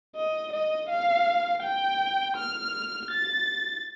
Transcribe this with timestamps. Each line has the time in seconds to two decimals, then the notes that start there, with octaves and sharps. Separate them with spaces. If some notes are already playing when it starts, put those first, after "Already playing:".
0.15 D#5
0.52 D#5
0.89 F5
1.63 G5
2.37 F6
3.11 A6